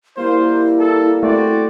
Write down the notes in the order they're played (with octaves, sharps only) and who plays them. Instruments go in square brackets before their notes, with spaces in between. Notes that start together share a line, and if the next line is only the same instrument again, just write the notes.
[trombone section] G3 A#3 [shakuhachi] E4 [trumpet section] F4 C5
[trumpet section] A4
[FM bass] A3 [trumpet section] C4 F#4 D5